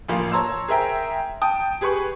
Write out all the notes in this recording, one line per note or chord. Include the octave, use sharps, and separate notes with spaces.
A1 D2 F3 A#3 F5
C#5 A5 A#5 C6 E6
G#4 A#4 C5 E5 G5 A#5
G5 A5 D#6
G4 G#4 B4 B5 C#6